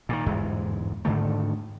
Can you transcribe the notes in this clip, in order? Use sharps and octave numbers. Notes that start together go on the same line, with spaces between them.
A#2 D3 D#3
G1 E2 G#2 G#3
G#2 D3 D#3 A3